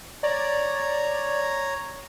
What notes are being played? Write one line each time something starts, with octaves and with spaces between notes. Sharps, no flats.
C#5 D5 A#5